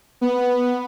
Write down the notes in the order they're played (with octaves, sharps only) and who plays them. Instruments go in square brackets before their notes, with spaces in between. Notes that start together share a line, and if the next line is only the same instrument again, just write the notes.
[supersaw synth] B3